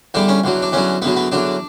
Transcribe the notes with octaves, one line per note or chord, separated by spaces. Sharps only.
E2 D3 G3 D4
C#4
E2 D3 F#3
D4
E2 D3 F#3 C#4
E2 D3 F#3 B3
B3
E2 D3 F#3 D4